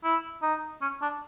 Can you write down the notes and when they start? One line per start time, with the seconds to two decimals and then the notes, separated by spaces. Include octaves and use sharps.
0.04 E4
0.42 D#4
0.82 C#4
1.02 D4